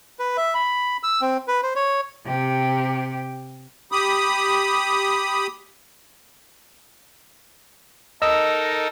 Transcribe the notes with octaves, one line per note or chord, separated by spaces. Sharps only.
B4
E5
B5
E6
C4
B4
C5
C#5
C3 G4
G4 B5 D#6
D#4 A4 A#4 D#5 E6